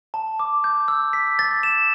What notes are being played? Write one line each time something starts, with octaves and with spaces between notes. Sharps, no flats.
A5
D6
G6
E6
B6
A6
E7